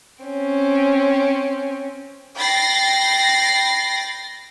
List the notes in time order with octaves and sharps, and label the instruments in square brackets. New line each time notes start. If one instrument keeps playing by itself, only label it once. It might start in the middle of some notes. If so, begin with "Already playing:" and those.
[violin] C4 C#4
[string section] G5 B5 A6 A#6 C7